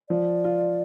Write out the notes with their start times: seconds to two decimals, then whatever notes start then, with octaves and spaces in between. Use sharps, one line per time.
0.10 F3 D5
0.44 F4